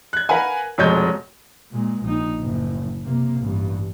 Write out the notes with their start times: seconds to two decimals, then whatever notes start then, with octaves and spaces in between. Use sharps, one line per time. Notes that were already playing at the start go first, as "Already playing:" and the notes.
0.13 F#6 G#6
0.29 A#4 B4 F5 F#5 G#5
0.78 F1 B2 G#3 C#5 D#5 G6
1.72 A#2 G#3
2.03 A#1 D#4
2.39 F#1 A2
3.04 C3 A#3
3.40 A1 G2